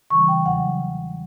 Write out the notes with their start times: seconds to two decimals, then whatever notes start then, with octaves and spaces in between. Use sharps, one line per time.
0.10 C#3 E3 G3 C#6
0.28 G5
0.46 E2 C#3 F#3 F#5
0.80 E2 C#3 F#3